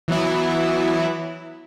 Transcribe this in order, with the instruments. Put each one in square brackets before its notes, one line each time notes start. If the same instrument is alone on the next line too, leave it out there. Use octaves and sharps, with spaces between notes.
[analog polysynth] E3 F#3 B3 E4